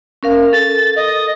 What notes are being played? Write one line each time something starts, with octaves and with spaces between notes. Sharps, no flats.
C#4 A#4 F5
A4 A6
D#5